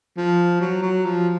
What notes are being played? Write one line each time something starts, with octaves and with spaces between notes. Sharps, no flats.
F3
F#3
F#3
F3